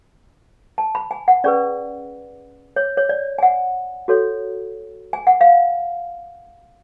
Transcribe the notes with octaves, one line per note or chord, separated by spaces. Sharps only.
A5
B5
G#5
F#5
C#4 G#4 B4 D5
C#5
C#5
D5
G#5
F#5
F#4 A4 C#5
G#5
F#5
F5